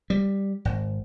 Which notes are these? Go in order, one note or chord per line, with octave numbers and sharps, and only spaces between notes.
G3
G#1